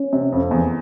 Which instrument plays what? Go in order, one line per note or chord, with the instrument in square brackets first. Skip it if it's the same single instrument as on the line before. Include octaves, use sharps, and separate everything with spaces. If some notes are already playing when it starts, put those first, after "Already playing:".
Already playing: [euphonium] C#4
[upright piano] C3
F2
E2